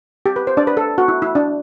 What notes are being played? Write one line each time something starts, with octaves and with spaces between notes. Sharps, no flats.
G4
B4
C5
D4 D5
B4
A4
F#4
E4
E4
D4